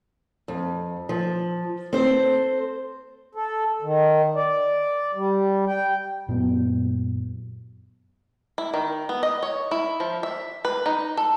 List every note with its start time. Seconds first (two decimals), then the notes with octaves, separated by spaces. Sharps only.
0.48 F2
1.09 F3
1.93 C4 A4 C5
3.35 A4
3.82 D#3
4.35 D5
5.15 G3
5.67 G5
6.28 F#2 A#2 F#3 B3
8.58 E4
8.74 D#3
9.09 B3
9.23 D#5
9.43 C#5
9.71 E4
10.00 F3
10.23 E5
10.65 B4
10.86 D#4
11.17 A4